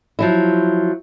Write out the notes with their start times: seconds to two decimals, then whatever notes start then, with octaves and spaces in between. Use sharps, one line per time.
0.19 F3 F#3 E4